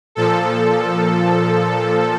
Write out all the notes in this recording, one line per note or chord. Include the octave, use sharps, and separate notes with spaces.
A#2 F3 A4